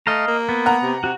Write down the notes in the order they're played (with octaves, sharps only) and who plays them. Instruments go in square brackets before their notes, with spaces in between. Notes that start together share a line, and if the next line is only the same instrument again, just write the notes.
[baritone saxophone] A3 [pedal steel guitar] D#5 F5 A#5
[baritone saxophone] A#3
[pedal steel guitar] B3
[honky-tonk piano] F#5 A#5
[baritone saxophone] C3
[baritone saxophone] C3 [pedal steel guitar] F#4